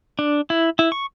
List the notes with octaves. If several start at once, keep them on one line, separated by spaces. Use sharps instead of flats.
D4
E4
E4
C#6